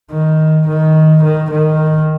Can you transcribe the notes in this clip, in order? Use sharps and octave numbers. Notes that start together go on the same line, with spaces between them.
D#3
D#3
D#3
D#3